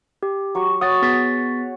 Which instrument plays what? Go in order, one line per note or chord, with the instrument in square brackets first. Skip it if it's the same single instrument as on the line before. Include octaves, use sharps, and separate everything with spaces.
[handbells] G4
[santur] F#3 C#6
[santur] C#5 F#5 [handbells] D#6 A6
[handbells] B3 A6 B6 [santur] G#4